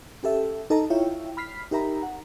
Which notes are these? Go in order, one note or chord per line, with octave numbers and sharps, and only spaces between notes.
C#4 G4 A4 E5
D#4 A4 D#5 A5 A#5
E4 F4 C#5 E5 G5
B5 F6 B6 C7
D#4 G4 A#4 E5 A#5 B5
F#5